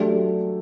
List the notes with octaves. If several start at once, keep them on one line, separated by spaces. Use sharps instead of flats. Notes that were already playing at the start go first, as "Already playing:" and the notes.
Already playing: F#3 A3 D4 G4